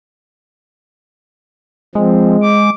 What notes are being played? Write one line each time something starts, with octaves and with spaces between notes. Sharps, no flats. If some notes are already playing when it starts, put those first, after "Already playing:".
F3 G#3 C4
D6